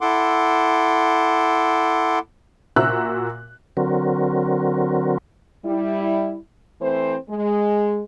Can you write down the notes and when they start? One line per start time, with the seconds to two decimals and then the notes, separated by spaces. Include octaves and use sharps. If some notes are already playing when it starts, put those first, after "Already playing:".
0.01 E4 A4 F#5 C6 D6
2.76 A#2 F#4 E5 A#5 E6 F#6
3.77 D3 F#3 C4 F#4 A#4
5.64 G3 E4
6.82 E3 A3 C4 C5
7.29 G#3